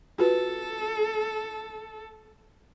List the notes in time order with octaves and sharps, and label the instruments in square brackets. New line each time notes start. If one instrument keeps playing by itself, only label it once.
[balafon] F4 F#4 B4 [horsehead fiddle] A4